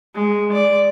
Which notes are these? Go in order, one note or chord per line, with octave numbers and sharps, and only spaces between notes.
G#3
D5